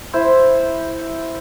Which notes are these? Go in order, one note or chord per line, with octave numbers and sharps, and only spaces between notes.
E4 C5